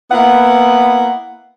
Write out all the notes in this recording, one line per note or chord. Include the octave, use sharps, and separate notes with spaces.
A#3 B3 E4 F#5